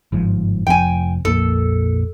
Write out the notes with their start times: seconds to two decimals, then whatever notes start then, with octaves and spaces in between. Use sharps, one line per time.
0.12 G1 G#2 F3
0.67 F1 F3 C4 G5 G#5
1.25 A#1 F2 A#3 A4